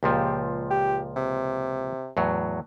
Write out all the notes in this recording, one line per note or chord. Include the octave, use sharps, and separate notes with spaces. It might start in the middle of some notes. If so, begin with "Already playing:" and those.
C#2 A#2 F3 G4
G4
C3
E2 A2 F#3